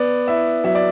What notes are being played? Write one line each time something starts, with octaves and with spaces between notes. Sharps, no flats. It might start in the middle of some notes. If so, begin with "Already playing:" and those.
Already playing: B3 D5
E4 E5
F#3 E5
D5